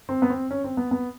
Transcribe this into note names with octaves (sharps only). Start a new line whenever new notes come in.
C4
B3
C4
C#4
C4
B3
B3